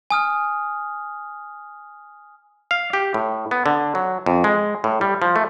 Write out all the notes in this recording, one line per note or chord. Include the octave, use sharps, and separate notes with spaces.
G#5 D#6 F6
F5
G4
A2
B3
D3
F#3
F2
G#3
A2
G3
F3
A3